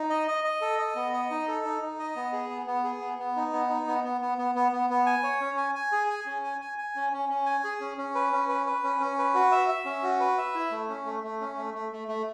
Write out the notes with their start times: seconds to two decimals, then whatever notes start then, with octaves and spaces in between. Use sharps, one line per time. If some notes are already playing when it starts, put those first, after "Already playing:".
Already playing: D#4
0.10 D#5
0.28 D#5
0.44 D#5
0.61 A4
0.79 D#5
0.95 B3
1.13 D#5
1.31 D#4
1.48 A4
1.65 D#4
1.82 D#4
1.99 D#5
2.16 B3
2.32 G#4
2.50 B3
2.67 B3
2.84 G#4
3.01 B3
3.19 B3
3.36 D#4
3.53 B3
3.69 D#4
3.87 B3
4.04 B3
4.21 B3
4.38 B3
4.55 B3
4.72 B3
4.90 B3
5.06 G#5
5.23 C#5
5.41 C#4
5.58 G#5
5.75 G#5
5.92 G#4
6.10 G#5
6.26 C#4
6.44 G#5
6.61 G#5
6.78 G#5
6.96 C#4
7.13 C#4
7.29 C#4
7.46 G#5
7.64 G#4
7.81 C#4
7.98 C#4
8.15 B4
8.33 C#4
8.49 B4
8.66 B4
8.83 C#4
9.00 C#4
9.18 B4
9.34 F#4
9.52 E5
9.69 E5
9.85 C#4
10.03 F#4
10.20 B4
10.38 E5
10.55 E4
10.71 A3
10.89 C#4
11.05 A3
11.23 A3
11.41 C#4
11.58 A3
11.74 A3
11.92 A3
12.08 A3